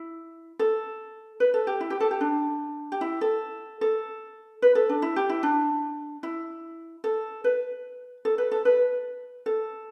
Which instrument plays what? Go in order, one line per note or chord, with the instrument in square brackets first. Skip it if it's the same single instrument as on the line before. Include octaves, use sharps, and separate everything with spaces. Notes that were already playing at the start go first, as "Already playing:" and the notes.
Already playing: [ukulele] E4
A4
B4
A4
G4
E4
G4
A4
G4
D4
G4
E4
A4
A4
B4
A4
D4
E4
G4
E4
D4
E4
A4
B4
A4
B4
A4
B4
A4